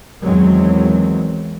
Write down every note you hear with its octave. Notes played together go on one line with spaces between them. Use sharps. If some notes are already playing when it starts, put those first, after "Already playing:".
E2 D#3 E3 F#3 G#3 C4